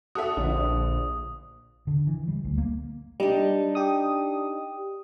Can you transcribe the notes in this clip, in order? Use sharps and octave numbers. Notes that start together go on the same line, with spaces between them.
F#4 A4 E5 D#6
A#1 D3
D3
E3
G3
D2
A#3
G3 D4 D#4
G4 D#6